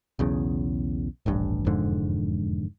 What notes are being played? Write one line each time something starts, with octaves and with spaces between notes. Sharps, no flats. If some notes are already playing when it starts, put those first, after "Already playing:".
B1 E2 C#3
D#1 A1 G2
E1 F2 G#2 D3